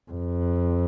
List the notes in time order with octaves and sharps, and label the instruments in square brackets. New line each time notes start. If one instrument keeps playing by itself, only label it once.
[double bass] F2